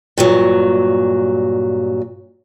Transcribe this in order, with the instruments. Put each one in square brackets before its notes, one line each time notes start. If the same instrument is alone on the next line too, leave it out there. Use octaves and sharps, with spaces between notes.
[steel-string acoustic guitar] G2 A#2 F#3